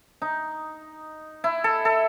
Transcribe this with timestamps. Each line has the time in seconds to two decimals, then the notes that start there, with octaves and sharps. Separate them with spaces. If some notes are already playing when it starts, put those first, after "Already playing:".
0.22 D#4
1.44 E4
1.64 A4
1.85 A4